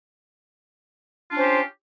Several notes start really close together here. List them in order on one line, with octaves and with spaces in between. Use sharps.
F4 D4 C#4 C5 G4